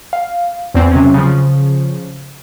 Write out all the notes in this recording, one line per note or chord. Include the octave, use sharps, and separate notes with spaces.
F5
E2 C4
C3 F#3 C#4
C#3 F3